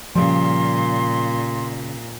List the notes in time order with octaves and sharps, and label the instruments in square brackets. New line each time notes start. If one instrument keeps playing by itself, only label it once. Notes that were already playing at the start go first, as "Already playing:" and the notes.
[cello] A#2 [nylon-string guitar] C#3 G3 [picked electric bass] F3 [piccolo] C6